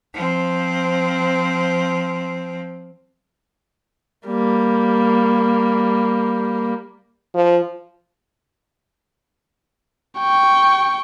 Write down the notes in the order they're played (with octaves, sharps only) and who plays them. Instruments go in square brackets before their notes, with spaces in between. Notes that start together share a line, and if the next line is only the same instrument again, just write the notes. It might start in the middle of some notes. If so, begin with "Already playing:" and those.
[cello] F3 C4
[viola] G3 A#3
[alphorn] F3
[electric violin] G5 C#6